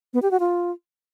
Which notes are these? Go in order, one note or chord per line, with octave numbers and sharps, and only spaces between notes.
B3
G4
F#4
F4